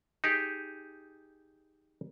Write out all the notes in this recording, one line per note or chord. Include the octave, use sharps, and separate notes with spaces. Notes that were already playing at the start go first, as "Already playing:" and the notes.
D#4 G4 G#4